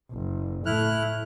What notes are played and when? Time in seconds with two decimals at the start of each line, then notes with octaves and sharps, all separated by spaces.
0.11 F#1
0.66 A2 A3 E4 F6 F#6